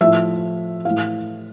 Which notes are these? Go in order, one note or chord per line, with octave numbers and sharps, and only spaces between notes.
A2 F3 E5
A2 E3 F5